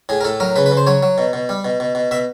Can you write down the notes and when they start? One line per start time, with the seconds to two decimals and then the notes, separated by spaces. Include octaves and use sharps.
0.09 A2 G#4
0.21 A#4
0.25 A2 A4
0.40 F#3 A#4
0.56 C#3 B4
0.66 B4
0.71 C#3
0.77 C5
0.87 F#3 C#5
1.03 F#3
1.18 B2
1.33 B2
1.49 G3
1.65 B2
1.80 B2
1.95 B2
2.11 B2 E5